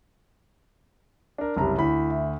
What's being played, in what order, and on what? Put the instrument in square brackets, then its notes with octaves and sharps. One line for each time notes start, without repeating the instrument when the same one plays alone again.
[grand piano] D4 A#4
[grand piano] F#1 C2 A#5 [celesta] G4 A5
[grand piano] D2 B5 [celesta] E4
[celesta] E5